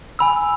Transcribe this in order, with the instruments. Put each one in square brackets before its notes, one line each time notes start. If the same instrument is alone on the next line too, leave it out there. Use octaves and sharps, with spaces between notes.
[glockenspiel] G#5 B5 E6